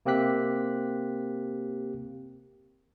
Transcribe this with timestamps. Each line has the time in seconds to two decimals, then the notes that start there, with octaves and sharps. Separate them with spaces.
0.06 C3 A#3 C4 G4 F#6 B6